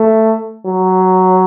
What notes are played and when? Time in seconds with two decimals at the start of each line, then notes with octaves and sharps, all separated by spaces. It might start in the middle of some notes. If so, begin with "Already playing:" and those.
Already playing: A3
0.67 F#3